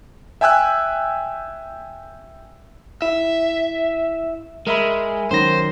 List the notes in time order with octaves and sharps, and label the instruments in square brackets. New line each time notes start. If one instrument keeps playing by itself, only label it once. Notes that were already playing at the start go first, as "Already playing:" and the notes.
[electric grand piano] E5 G5 G#5 E6 F#6
[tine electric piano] E4 [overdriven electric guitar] E5
[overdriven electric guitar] G#3 [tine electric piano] A#4 E5 B5
[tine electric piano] F#2 D#3 A#6 [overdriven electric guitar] C5